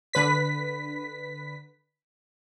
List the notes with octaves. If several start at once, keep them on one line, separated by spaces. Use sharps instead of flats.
D3 B4 B6